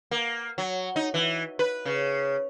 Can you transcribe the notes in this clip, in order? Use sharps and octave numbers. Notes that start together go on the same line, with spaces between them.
A#3
F#3
D#4
E3
B4
C#3